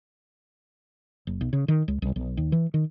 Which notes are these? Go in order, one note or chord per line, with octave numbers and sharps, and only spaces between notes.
F#1
B1
C#3
D#3
C#2
C2
B1
D#2
E3
D#3